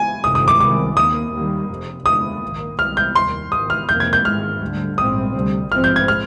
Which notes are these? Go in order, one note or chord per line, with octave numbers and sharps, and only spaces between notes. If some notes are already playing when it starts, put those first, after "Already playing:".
Already playing: G#5
G1 F2 C3 D#3 D#6
D#6
D6
C2 C3 D#3 G#3 D6
D#2 D#3 A#3 D#6
D#2 D#3 G3 A#3
F1 F2 C3
D#2 D3 G#3 D#6
A#1 G#2 D#3 A#3
C2 C3 D#3 G3 F6
G6
F1 D#2 D#3 C6
G#1 G#2 D#3 D#6
F6
F2 C3 D#3 A#3 G6
G#6
G6
G#1 G#2 D#3 G#3 F6
D2 D3 G3
A#1 G#2 G3 C4 D#6
D2 C3 G3
A#1 G#2 F3 G#3 C4 F6
G6
G#6
F6